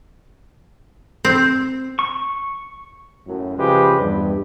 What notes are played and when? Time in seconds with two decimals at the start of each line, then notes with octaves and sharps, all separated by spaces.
1.25 C4
1.99 C#6
3.27 F#2 A2
3.58 C#3 F3 G#3 G4 B4
3.98 E2 G2